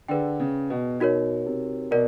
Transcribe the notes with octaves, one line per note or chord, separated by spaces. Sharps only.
D3 G#4 B4 D5 G5
C#3
B2
B2 D#4 F#4 A#4 C#5
C3
B2 A#4 D5